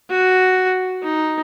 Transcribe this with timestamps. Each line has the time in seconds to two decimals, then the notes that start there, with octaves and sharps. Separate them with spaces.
0.10 F#4
1.03 D#4